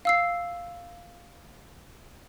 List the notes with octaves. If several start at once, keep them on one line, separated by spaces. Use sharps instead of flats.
F5 E6 C7